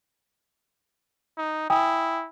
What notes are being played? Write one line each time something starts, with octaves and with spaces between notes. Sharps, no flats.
D#4
E4 G5 G#5 D#6